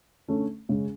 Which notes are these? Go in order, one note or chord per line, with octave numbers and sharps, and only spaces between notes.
D3 A3 C#4
C#3 G#3 C#4